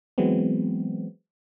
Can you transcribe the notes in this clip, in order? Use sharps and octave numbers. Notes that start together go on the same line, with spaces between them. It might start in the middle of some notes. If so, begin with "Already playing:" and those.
E3 F#3 G#3 B3 C4